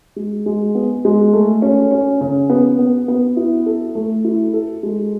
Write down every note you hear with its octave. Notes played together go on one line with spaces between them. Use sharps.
G#3
G#3
B3
G#3
A3
C#4
C#4
C#3
B3
B3
B3
E4
A4
A3
E4
A4
G#3